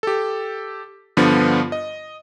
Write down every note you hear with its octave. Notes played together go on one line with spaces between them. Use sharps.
G4 A4
G2 D3 F3 B3
D#5